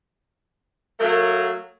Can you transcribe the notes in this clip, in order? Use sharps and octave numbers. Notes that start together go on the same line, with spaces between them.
F#3 A3 A#3 A#4